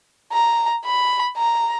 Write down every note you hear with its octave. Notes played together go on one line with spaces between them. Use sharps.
A#5
B5
A#5